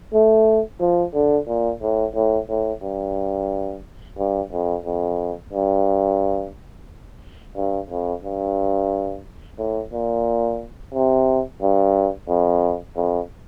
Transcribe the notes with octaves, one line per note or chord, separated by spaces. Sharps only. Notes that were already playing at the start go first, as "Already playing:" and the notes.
A3
F3
D3
A#2
A2
A2
A2
G2
G2
F2
F2
G2
G2
F2
G2
A2
A#2
C3
G2
F2
F2